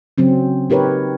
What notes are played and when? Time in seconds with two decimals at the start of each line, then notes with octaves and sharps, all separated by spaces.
0.18 C#3 F#3 C4 C#4
0.70 D#4 G4 A#4 B4 C#5